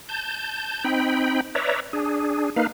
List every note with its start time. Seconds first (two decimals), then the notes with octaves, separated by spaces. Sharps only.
0.09 A5 G6
0.84 C4 D#4 G5 B5
1.55 B4 C#5 D5 E5 A#5
1.93 D4 G#4
2.56 A#3 D#4 B4 F5